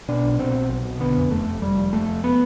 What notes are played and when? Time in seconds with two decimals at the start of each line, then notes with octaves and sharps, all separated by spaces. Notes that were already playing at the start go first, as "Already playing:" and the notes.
0.08 B2 D4
0.24 B1
0.39 B2 C4
0.55 B2
0.69 B1
0.85 B2
1.00 D3 B3
1.16 F2
1.31 F1 A3
1.46 F1
1.62 F1 G3
1.77 F2
1.92 F1 A3
2.08 F2
2.24 B3